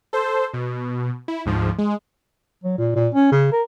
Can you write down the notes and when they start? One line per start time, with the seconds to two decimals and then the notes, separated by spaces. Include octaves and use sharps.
0.13 A4 C5
0.54 B2
1.28 E4
1.46 D2 G#2 F3
1.78 G#3
2.64 F#3
2.78 A#2
2.95 A#2
3.14 C#4
3.32 C#3
3.52 A#4